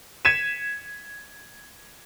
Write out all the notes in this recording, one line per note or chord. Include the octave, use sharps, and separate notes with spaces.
G#6 B6 C#7 D#7 E7